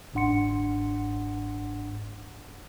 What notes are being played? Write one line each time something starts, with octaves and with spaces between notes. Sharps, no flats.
G1 G#2 D4 F#5 C6 C#7